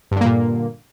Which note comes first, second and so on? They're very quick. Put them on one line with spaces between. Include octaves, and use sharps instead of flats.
G2 D3 A#3 A#2